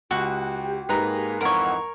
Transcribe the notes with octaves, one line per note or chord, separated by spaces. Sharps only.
C#2 F#4 G4
G#2 A#3 G#4 A#4 B4 A#5
F2 E3 D#4 A#4 C#5 F#5